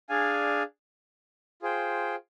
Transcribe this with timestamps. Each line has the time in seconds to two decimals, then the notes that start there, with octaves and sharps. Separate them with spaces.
0.09 D4 G#4 D5 F5 G#5
1.62 F4 G#4 C5 G5